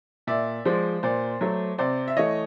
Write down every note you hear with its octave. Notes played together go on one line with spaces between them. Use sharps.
A#2 D5 E5
F3 G#3 C5 D5
A#2 C5 D5
F#3 A3
C3 C5 D5
E5
E3 A3 C#5 D#5